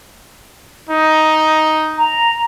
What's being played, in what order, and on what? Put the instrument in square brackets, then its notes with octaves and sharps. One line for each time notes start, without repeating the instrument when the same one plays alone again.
[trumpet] D#4
[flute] A#5